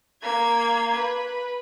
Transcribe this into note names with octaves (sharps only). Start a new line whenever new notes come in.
A#3 G#6
B4